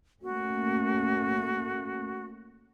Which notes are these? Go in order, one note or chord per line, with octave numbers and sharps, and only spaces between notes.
A3 A#3 C#4 F#4